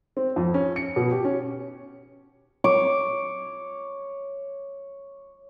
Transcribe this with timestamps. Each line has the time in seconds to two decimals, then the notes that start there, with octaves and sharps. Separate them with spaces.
0.17 C4
0.36 F2
0.54 C#4
0.76 C#7
0.96 B2
1.12 G4
1.25 C#4
2.64 C#5 D6